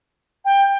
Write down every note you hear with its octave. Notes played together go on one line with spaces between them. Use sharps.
G5